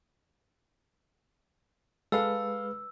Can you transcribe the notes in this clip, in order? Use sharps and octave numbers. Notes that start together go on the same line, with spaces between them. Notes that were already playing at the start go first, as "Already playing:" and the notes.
G#3 A4 B4 F5 E6